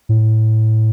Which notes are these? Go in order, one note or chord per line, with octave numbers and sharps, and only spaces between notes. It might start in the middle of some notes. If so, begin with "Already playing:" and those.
A2